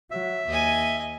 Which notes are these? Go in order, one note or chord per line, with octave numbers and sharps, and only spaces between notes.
F#3 E5
D#2 D#5 G#5